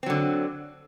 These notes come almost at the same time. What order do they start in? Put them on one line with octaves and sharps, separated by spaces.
C4 F#3 D3